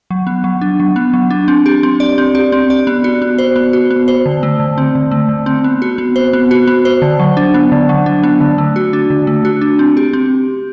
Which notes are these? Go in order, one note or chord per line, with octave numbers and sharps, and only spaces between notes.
F#3
B3
F#3
D4
F#3
B3
F#3
D4
C4
G4
C4
D5
C4
G4
C4
D5
B3
F#4
B3
C5
B3
F#4
B3
C5
D3
A3
D3
C4
D3
A3
D3
C4
B3
F#4
B3
C5
B3
F#4
B3
C5
D3
F#3
D4
B3
D3
F#3
D4
B3
D3
A3
F#4
D4
D3
A3
F#4
D4
C4
G4
C4